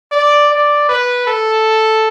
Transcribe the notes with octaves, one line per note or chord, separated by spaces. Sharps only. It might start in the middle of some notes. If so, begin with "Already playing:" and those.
D5
D5
B4
A4